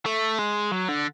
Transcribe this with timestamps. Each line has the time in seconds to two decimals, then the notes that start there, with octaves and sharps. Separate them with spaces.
0.06 A3
0.39 G#3
0.71 F#3
0.88 D3